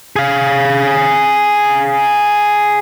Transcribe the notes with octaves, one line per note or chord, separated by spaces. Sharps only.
G#4 F5